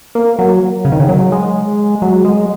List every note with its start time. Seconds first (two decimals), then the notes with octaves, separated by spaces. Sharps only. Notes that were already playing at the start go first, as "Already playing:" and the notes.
0.15 A#3
0.39 F#3
0.85 C#3
0.92 D#3
1.00 C#3
1.09 F#3
1.32 G#3
2.02 F#3
2.25 G#3